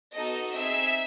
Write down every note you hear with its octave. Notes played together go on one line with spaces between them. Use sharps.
B3 D#4 F#4 A4 D#5
C4 D#4 G#4 E5